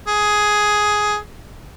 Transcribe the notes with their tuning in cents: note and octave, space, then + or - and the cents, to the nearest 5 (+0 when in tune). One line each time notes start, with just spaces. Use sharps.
G#4 +10